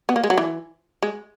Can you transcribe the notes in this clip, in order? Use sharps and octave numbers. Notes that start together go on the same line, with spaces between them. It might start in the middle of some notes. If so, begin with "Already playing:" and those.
B3
A#3
G#3
F#3
E3
G#3